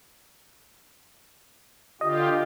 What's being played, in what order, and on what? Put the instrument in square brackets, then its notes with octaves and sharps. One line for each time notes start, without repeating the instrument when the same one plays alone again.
[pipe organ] D3 F4 G4 [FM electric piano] D#5